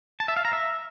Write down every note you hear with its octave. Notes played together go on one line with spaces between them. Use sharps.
A5
E5
F5
A#5
E5